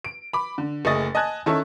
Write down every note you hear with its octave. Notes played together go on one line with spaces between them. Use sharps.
D7
B5 D6
D3
F#1 A3 G#4 D#5 A6
D#5 G#5 A5 F#6 G#6
D#3 C#4 E4 A4